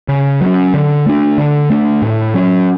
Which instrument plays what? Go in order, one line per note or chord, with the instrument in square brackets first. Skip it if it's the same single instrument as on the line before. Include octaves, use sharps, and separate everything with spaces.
[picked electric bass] C#3
F#3 C#4
D3
A3 D4
D3
A3 D4
A2
F#3 C#4